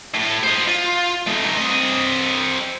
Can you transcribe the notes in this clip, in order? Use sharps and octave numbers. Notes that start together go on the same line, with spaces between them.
A2
C5 D#5
F4
A3 D#4
C4 D#5